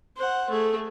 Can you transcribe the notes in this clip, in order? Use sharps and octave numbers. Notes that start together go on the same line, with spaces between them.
C5 F#5
A3 G#4